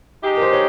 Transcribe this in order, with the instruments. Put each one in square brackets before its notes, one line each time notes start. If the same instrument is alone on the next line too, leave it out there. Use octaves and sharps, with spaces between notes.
[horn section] G#3 D#4 G4
[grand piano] A#4
C5
C#5